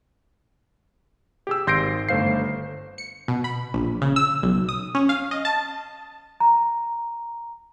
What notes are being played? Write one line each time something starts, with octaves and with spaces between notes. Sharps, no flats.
G4 G#4 E6
G#1 C6 G6 A#6 C7 D7
G1 A3 C5 F5 C7
C#7
B2
B5
A#1
C#3
E6
B1
D#6
C#4
F5
D#5
A5
A#5